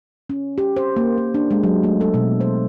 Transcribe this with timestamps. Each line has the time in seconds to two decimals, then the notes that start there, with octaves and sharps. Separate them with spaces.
0.30 C#4
0.58 G4
0.77 C5
0.96 A#3
1.18 A#3
1.34 D4
1.51 G#3
1.63 F#3
1.83 A3
2.01 A4
2.14 B2
2.41 C5